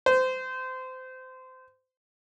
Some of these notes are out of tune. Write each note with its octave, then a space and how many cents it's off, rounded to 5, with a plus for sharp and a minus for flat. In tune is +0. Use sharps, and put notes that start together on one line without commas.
C5 -25